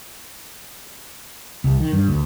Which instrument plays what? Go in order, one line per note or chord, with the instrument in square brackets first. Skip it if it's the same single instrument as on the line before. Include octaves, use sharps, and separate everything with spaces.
[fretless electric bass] C2
D#3
G2
D2